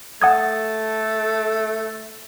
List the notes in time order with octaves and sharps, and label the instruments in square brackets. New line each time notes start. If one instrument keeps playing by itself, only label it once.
[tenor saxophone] A3 [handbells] F#5 D#6 G#6 [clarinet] A5